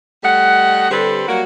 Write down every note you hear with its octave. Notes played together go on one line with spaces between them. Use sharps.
G3 A3 D#5 F#5
D3 G3 C4 G4 A4 B4
F#3 G3 A#3 F#4